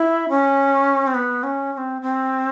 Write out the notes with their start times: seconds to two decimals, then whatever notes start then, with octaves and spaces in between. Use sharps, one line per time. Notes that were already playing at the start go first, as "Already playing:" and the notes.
Already playing: E4
0.29 C#4
1.07 C4
1.15 B3
1.43 C#4
1.73 C#4
1.78 C4
2.02 C4